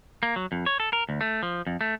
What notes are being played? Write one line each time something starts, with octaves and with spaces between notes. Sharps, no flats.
A#3
F#3
F2
C#5
A4
A#4
D2
A3
F3
F2
A3